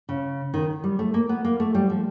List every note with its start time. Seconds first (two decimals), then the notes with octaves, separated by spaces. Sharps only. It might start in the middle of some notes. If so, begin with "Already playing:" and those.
0.09 C#3
0.54 D#3
0.84 G3
0.99 A3
1.14 A#3
1.29 B3
1.44 A#3
1.60 A3
1.75 G3
1.90 F3